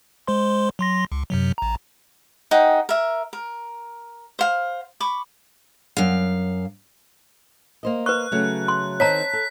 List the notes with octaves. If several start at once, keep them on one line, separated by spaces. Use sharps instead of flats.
G#3 C5 C6
F#3 C6 A#6
C#2
F#2 C3 F#3
A1 A#5
D#4 G#4 F#5 G5
A#4 E5
A#4
C5 F5
B5 C#6 D6
F#2 F5
A#3 C5 D#5
B4 C#6 F#6
C#3 F#3 A3
C6
D#3 C4 D#4 C#5 A5 A#5 B6
A4